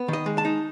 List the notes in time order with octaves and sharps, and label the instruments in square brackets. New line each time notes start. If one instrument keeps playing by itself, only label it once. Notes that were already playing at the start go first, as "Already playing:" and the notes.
Already playing: [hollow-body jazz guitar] B3
D#3 D#5
G#3
A5
D#4